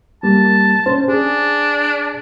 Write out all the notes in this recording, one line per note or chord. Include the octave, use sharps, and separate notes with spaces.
G3 A#3 A5
C#4 C5
D4 G#4